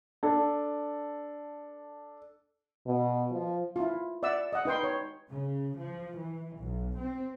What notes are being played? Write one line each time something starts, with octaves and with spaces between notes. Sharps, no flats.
D4 A4
B2
F3
E4 F4
D5 E5 F#5 E6
D#5 F#5
D#4 B4 G5 C6
C#5
C#3
F3
E3
B1
C4